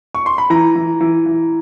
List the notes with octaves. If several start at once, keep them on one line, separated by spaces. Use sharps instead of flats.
C#6
C6
B5
E3 A#5
E3
E3
E3